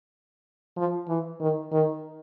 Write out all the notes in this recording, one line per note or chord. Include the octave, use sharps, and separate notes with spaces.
F3
E3
D#3
D#3